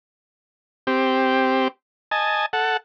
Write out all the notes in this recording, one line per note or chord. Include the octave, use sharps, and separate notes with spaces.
C4 G4
D#5 G#5 A5
A4 F#5